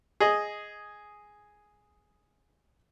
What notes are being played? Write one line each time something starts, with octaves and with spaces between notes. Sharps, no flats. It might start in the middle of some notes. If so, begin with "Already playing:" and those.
G#4 D#5